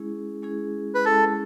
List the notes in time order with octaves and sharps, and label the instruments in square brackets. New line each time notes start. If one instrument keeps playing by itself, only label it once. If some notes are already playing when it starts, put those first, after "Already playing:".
Already playing: [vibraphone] G#3 C#4 E4 G#4
G#3 C#4 E4 G#4
[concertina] B4
[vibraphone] G#3 C#4 E4 G#4 [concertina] A4